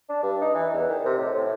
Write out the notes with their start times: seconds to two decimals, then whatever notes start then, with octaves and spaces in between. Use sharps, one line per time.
0.09 D4
0.23 G2
0.41 D#4
0.54 E3
0.74 E2
0.89 D#3
1.05 C3
1.18 A2
1.35 A2